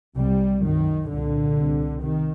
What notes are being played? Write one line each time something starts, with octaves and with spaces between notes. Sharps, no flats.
C2 C3 G3
F#2 D#3
C2 A#2 D3
C2 C3
C3 D#3